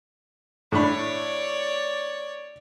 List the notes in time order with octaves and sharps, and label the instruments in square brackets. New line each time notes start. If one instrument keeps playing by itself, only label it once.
[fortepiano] A2 D4 B5 [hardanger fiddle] C#5 D5